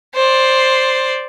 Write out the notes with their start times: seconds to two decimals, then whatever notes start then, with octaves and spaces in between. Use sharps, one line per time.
0.15 C5 D5